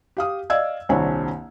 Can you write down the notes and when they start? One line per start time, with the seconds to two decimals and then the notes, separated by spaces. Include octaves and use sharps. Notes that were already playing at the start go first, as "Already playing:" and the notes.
0.17 G4 F5 D#6
0.50 D5 D#5 F5 E6 G#6
0.89 D#1 C2 C4 D4 C#5 G#5